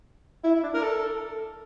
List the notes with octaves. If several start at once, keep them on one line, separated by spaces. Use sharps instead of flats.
E4
E4
D4
A#4
A4